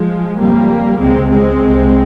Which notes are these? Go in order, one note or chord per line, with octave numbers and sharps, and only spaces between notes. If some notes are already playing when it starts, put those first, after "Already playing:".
Already playing: F3 G#3
F2 C#3 G3 A#3
C#2 C3 G#3 C4
G#3 C4
C2 C3